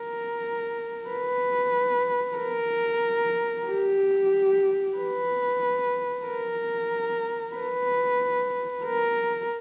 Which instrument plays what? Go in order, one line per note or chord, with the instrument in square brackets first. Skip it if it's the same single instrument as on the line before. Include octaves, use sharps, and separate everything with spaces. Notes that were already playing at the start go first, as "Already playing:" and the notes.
Already playing: [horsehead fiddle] A#4
B4
A#4
G4
B4
A#4
B4
A#4